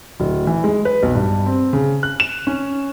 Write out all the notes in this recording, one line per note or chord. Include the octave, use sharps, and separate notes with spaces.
D1
E3
G#3
B4
B1
G2
C4
C#3
F#6
E7
C#4